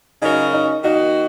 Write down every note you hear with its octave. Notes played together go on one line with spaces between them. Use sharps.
C#3 F#3 C#4 D#4 F#4 A#4
D#4
D#3 A#3 D#4 F#4